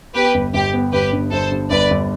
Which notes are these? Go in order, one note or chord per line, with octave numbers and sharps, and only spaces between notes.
B3 G4 B4
G1
G1 G4
B3
G1 G4 B4
G2
G1 A4 C5
G2
G1 B4 D5
G1